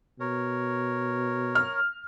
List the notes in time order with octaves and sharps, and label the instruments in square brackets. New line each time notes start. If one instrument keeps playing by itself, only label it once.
[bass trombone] B2 [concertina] A#4 C#5
[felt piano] F6